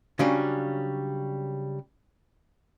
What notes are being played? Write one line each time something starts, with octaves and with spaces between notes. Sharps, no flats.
C#3 F#3 G3 C#4 D4 D5